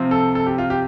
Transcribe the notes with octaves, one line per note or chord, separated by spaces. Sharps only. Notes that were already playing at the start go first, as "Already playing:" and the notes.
Already playing: C3 F3 C4
A4
A4
G4
F4
G4